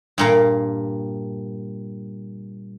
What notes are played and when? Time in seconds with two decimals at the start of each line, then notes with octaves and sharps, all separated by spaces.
0.18 G2 A#2 A#3